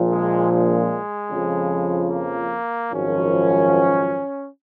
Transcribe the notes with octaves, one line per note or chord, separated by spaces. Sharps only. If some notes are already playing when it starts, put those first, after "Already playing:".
Already playing: A#1 A#2 F3
G#3
G#3
F2 C#3 F3
A#3
G#1 F#2 F3 C#4